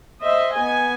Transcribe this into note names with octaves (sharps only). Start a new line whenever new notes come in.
C5 D#5 E5
B3 G#5